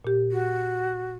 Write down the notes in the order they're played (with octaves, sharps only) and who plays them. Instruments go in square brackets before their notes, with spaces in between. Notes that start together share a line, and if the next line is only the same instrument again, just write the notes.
[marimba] A#2 G4
[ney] F#4